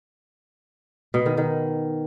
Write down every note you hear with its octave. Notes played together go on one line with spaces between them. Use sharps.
B2
D#3
D#3